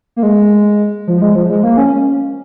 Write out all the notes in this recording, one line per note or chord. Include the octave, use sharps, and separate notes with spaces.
A#3
G#3
F3
G#3
F3
G#3
A#3
C#4